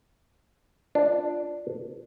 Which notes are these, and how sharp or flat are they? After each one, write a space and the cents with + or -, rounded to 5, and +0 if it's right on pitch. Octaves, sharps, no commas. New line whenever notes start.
D4 +0 F4 -5